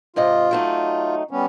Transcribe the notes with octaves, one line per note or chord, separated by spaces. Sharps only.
G#2 C3 F4 D#5
F#3 A3 D#4
G3 B3 C#4